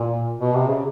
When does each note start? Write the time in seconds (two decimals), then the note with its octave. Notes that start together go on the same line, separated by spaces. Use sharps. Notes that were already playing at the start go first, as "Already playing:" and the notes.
Already playing: A#2
0.40 B2
0.55 C3
0.70 C#3